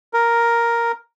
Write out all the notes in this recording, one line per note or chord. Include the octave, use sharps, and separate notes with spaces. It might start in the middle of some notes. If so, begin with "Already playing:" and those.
A#4